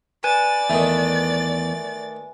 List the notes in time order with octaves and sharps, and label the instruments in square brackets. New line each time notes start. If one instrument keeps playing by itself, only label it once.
[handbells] B4 G#5 [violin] D5 A6
[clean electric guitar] E2 [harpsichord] D#3 A3